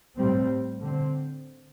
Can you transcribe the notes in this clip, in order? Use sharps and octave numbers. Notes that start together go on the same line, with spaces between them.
A2 G3 C4
D3 C4